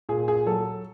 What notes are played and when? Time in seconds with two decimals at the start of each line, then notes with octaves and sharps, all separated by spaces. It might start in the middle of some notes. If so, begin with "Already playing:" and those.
0.09 A#2 G#4
0.28 G#4
0.46 F#3 A4